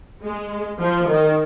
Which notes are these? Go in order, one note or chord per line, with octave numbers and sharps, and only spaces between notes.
G#3
F3
D#3